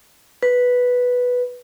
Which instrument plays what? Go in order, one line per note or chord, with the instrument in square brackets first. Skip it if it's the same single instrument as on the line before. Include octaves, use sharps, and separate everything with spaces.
[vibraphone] B4